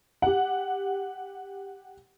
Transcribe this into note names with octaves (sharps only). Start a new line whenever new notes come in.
G4 F#5